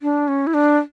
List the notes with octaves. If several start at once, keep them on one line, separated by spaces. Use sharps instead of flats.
D4
C#4
E4
D4